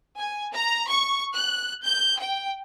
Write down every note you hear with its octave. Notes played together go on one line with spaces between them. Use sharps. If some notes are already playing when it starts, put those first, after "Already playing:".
G#5
A#5
C#6
F#6
G6
G5